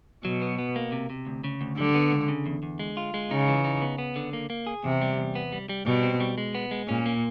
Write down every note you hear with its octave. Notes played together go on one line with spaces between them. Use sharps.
B2 F#3
B3
B3
A#3
C3
C3
D2
C#3
D2
D3 G3
B3
C#2
C#3
E2
E2
G#3
F4
G#3
C#3 D#4
E3
D#4
B3
B3
D3
A#3
A#3
G#4
E2 C3
G3
E2
B3
G3
G3
B2 G3
C4
G3
G#3
B3
G#3
A#2 C#4
A#3